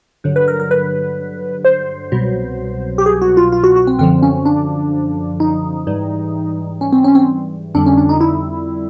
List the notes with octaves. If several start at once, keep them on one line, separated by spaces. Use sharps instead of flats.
G2 D3 F#3
B4
A#4
A#4
B4
C5
C2 B2 F#3
G4
G#4
F#4
F4
F4
F#4
F#4
C4
F#2 D3 F3 C4
C#4
D4
D#4
G#2 E3 G3
C#4
C4
C#4
C4
F2 D3 G3 D4
C#4
D4
D#4
E4